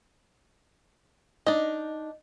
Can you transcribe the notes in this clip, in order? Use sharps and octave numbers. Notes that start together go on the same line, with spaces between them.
D4 D#4 D#5